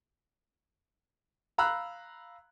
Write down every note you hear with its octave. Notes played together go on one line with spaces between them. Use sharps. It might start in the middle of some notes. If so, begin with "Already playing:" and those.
F5 A#5 B5 E6 F#6